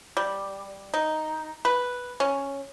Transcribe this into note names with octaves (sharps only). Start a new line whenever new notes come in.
G3
D#4
B4
C#4